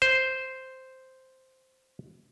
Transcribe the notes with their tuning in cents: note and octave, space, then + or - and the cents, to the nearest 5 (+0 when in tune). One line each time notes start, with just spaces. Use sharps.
C5 -5